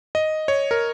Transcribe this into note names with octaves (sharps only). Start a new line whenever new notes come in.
D#5
C#5
A#4